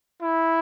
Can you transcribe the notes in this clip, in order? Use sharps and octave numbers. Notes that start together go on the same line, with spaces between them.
E4